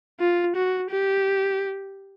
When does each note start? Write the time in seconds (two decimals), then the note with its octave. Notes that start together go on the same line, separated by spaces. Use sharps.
0.20 F4
0.56 F#4
0.91 G4